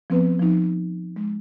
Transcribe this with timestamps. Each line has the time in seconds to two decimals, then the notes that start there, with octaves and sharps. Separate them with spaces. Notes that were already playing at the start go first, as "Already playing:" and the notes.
0.10 F3 B3 C4 B4
0.39 F3 D#4
1.16 G#3